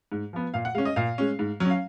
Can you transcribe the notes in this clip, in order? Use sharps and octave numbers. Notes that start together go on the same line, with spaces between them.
G#2
F3 B3
A#2 F5
F#5
G#3 C#4 F5
D#5
A#2 F5
G#3 C#4
G#2
F#3 C#4
F5